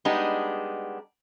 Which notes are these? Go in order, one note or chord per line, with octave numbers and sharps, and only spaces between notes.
G3 G#3 B3 D4 D#4